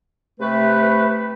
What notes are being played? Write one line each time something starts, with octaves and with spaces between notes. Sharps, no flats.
C3 A3 B4